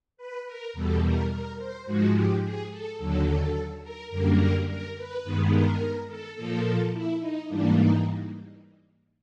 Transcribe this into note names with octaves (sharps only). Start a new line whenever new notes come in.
B4
A#4
E2 B2 G3 A4
A#4
A#4
C5
G#2 F3 G#3 F#4
G4
G#4
A4
D#2 D3 F#3 A4
A#4
F#2 D3 G3 A#3 A#4
A#4
B4
G2 D#3 G#3 B3
A#4
A4
A#2 F3 A#3 A4
E4
D#4
G#2 E3 G3 A#3 D4
D#4